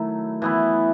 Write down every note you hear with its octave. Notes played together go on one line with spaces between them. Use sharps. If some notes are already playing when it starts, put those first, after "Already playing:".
Already playing: D#3 F#3 A3 E4
E3 B3 E4